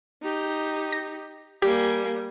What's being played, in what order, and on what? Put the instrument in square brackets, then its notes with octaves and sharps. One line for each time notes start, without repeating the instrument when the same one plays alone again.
[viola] D#4 G4
[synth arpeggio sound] A#6
[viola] G3 [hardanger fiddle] A#3 G#5 [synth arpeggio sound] G4